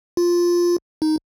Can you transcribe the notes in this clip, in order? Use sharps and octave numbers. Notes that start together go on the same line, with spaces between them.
F4
D#4